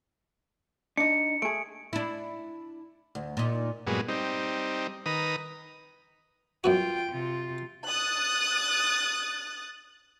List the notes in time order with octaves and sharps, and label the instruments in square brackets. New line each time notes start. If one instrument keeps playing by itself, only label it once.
[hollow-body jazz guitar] D4 D#4 [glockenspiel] C#7
[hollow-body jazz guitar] A3 G#4 [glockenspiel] D7
[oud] D4 E4
D2
A#2 D#4
[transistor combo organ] G2 A#2 F#3 G#3 B3
G3 C4 D#4
D#3 B4 A#5 D#6
[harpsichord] F#2 B3 F#4 [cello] F4 G5
[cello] C3 F4
[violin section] D#6 F#6 A6